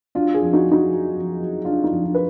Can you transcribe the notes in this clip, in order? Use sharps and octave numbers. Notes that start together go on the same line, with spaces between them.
F#3 D4 F4
F4 G#4
F2
D#4 F#4
F#3
D#4 F#4
F#3
F2
F#3
F#3 D4 F4
D#4
F2
D4
B4